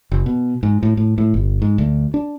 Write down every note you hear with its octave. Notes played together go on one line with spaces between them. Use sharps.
F#1
B2
G#2
A2
A2
A2
G1
G#2
D2
D4